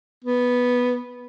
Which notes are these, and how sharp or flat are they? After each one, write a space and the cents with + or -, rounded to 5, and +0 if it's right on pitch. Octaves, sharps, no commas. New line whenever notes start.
B3 -5